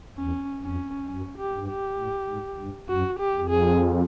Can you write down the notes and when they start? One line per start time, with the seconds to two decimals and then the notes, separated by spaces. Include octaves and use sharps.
0.17 E2 C#4
0.63 F2 C#4
1.08 F#2 C#4
1.38 G4
1.54 G2
1.69 G4
1.99 A2
2.29 G#2
2.60 G2
2.89 F#2 F#4
3.19 G4
3.35 F2
3.50 G#4